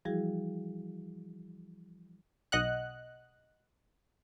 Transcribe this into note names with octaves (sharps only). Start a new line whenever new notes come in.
E3 F3 G3 E4 F#4 G#4
B1 D#5 F#5 F#6